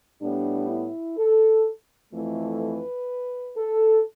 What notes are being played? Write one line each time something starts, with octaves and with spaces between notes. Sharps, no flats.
A2 G3 B3 D4
E4
A4
F2 E3 A3
B4
A4